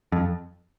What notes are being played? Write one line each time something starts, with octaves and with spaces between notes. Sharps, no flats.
F2